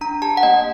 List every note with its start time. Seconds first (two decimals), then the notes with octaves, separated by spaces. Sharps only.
0.01 D4 A#5
0.22 G4 A5
0.37 F#5
0.43 A#3 D#5